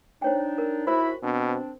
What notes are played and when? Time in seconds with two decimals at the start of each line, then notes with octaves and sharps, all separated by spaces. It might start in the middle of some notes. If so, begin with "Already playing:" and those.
0.22 D4 D#4 C5 C#5 G5
0.58 A#4
0.87 G#2 E4 F#4 C5 B5
1.23 B2 C4 D4